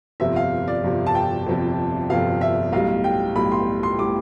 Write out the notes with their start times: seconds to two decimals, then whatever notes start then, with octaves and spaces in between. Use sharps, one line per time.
0.20 G1 F2 C3 E5
0.36 F5
0.68 D5
0.83 G1 F2 C3
1.07 A5
1.15 G5
1.47 G1 F2 C3
2.10 G1 F2 C3 F5
2.41 E5
2.72 B1 A2 G3 F5
3.04 G5
3.36 B1 A2 G3 B5
3.52 C6
3.83 C6
3.99 A2 G3 D6